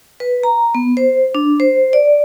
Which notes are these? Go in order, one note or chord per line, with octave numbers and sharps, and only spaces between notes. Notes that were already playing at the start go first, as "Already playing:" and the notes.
B4
A#5
B3
C5
D4
C5
D5